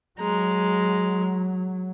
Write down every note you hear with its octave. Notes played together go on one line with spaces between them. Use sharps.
F#3 G#3 A#5